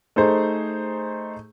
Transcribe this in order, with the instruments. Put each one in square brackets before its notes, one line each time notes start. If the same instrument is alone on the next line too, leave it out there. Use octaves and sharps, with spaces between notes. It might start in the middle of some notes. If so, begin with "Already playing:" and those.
[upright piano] A3 D#4 G#4 C5